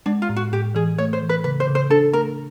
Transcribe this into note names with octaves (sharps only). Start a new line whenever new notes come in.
G#3 D4
F4
A2
F#4
A2 G4
E3 G#4
A3 C#5
C5
E3
B4
C#3 B4
C5
C#3
C5
D4 A4
A3 A#4